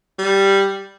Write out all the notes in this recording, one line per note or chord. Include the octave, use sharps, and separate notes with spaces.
G3